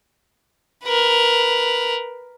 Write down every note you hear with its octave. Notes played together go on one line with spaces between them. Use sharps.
A#4 B4